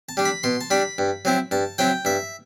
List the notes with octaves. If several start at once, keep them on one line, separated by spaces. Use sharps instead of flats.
A5
G3 D4
B5
B2 C6
A5
G3 D4 B5
G2
F#3 C4 E4
G2 A5
F#3 C4 E4 G5
G2 E5